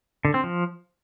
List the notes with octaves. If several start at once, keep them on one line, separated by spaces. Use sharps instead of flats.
D3
C4
F3